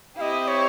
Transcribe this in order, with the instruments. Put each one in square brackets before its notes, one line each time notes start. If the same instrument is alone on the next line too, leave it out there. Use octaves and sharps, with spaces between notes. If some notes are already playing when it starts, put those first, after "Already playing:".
[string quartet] C4 E4 G4 [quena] D#5 F5
[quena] C#5